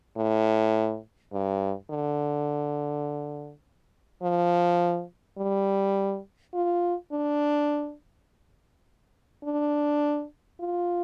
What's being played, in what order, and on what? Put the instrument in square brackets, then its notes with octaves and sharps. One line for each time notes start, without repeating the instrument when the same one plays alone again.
[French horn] A2
G2
D3
F3
G3
F4
D4
D4
F4